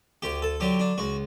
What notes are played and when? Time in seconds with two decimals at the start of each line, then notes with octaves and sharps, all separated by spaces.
0.22 D2 G4
0.42 A4
0.60 D3 F#3 G4
0.80 D4
0.98 C#2 F#4